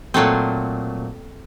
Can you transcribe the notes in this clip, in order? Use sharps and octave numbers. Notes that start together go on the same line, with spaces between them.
A#2 F#3 A3 C4